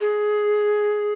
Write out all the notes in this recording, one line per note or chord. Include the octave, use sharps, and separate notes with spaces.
G#4